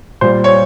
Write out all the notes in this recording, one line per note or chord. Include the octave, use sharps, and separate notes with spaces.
A#2 G3 C5
C#5